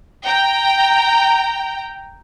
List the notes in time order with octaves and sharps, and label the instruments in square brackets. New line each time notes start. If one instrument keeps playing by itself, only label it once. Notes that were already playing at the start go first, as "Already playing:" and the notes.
[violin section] G5 A#5